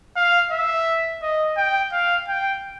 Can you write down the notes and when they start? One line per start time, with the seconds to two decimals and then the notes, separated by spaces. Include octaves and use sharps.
0.16 F5
0.51 E5
1.22 D#5
1.57 G5
1.92 F5
2.28 G5